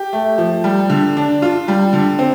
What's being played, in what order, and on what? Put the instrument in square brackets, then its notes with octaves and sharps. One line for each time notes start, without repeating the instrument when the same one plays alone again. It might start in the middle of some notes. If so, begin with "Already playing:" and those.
Already playing: [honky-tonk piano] G4
A3
F3
G3
D3
D4
F4
G3
D3
C4